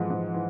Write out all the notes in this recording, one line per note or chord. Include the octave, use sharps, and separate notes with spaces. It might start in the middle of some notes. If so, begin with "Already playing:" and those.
Already playing: G#2 E3 F3 G#3
G#2
E3